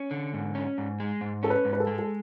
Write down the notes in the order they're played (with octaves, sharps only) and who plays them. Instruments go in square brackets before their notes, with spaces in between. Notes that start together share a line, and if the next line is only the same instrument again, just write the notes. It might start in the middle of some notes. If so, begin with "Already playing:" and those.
Already playing: [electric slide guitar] C#4
D3
G#2
C#4
G#2
G#3
G#2
[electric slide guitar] C#4 [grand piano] A4
[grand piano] B4
[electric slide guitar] G#2
[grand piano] B4
A4
[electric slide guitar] G#3
[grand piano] A4